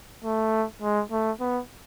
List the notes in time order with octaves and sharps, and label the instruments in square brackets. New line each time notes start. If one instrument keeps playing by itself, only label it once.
[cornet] A3
G#3
A3
B3